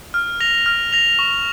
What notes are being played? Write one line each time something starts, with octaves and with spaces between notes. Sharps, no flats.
F6
A#6 F7
F6
A#6 F7
C#6